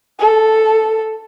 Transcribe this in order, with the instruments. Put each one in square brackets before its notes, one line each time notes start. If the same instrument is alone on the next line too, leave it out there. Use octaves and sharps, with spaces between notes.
[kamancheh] A4